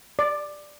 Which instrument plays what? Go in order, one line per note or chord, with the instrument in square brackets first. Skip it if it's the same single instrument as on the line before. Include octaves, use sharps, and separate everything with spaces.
[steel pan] D5